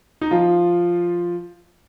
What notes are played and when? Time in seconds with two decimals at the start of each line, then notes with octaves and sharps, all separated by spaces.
0.21 D#4
0.31 F3 F4